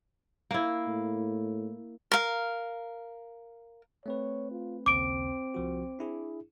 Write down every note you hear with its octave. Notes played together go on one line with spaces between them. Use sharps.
A#3 E4
A2
A#4 F5
A3 C4 B4 C#5
F4
A#1 D#2 C#3 C4 D6 D7
C2 F3 F#4
D4 E4 G#4